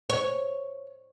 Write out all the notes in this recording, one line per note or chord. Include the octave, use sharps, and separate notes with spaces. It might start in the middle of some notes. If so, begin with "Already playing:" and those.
C#5